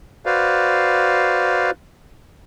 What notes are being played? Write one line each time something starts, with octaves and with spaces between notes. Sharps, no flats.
F#4 B4 C5 D5 F5